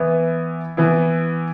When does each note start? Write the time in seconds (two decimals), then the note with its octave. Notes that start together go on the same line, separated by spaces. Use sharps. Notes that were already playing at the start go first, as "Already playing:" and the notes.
Already playing: E3 B3 E4
0.77 E3 B3 E4